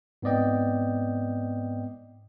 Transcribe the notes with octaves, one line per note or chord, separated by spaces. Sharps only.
G#2 B3 C4 D5 D#5 G5